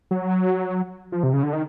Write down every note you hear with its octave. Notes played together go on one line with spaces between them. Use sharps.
F#3
F3
C3
C#3
D3
D#3